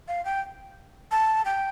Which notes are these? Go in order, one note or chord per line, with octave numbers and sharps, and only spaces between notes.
F5
G5
A5
G5